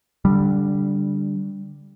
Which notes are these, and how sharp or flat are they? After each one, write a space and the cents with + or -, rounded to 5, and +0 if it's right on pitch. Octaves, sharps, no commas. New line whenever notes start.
D3 -15 G3 +0